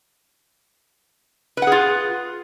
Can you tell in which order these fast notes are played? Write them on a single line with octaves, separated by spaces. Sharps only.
B4 F#5 G#4 F4